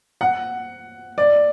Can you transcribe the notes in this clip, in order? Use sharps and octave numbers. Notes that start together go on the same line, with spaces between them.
F#5
D5